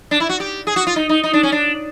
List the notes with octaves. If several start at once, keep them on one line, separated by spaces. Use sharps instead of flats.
D4
E4
F#4
G4
G#4
F#4
F4
D#4
D#4
D#4
D4
C#4
D4